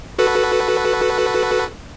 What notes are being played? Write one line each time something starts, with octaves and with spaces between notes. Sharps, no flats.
F#4 A4 B4